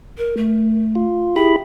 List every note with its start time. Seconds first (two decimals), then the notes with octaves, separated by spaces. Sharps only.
0.18 A#4
0.37 A3
0.95 F4
1.36 E4 G4 G#4 B5